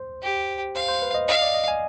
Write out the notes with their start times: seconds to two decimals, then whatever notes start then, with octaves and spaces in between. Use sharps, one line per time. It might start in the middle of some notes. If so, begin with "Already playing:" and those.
Already playing: C5
0.22 G4
0.76 C5 F5
0.88 C5
1.02 B4
1.14 D#5
1.28 D#5 F5
1.42 D5
1.54 D#5
1.68 G#5